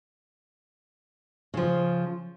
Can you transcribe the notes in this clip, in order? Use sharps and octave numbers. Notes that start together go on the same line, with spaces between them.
C#3 F3